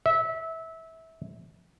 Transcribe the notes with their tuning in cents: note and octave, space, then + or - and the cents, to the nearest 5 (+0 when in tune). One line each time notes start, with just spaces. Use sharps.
E5 -20